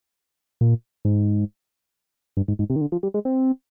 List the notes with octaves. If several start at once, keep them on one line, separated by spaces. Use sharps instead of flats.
A#2
G#2
G2
G#2
G#2
C3
D#3
D3
F3
G3
G#3
C4